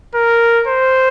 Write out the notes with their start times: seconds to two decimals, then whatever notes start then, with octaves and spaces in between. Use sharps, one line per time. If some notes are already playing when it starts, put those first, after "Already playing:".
0.15 A#4
0.67 C5